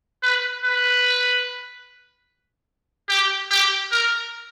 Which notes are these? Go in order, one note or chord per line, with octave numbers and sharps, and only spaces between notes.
B4
B4
G4
G4
A#4